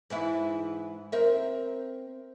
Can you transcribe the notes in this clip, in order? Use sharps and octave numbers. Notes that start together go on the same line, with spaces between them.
G#2 E3 E4
C4 A#4 E5